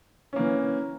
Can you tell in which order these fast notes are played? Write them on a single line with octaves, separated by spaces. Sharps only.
C#4 A#3 E3